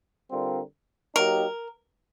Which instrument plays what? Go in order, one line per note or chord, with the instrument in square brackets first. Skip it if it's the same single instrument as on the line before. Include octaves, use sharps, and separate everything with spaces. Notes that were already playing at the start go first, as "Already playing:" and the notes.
[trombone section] D3 G3 C4 F4 A#4
[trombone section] F#3 A#3 D#4 G4 [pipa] A#4